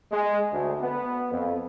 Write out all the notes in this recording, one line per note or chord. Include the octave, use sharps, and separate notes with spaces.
G#3
D2
B3
F2